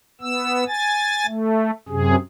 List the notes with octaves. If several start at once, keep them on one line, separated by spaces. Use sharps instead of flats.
B3 E6
G#5 A6
A3
F#2 C3 G#4